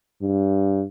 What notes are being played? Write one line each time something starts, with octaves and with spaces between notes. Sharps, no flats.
G2